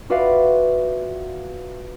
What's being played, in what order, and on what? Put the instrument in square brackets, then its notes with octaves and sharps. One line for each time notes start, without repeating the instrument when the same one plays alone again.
[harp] F4 F#4 B4 D5 E5 F5